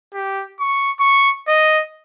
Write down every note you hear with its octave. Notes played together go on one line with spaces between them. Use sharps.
G4
C#6
C#6
D#5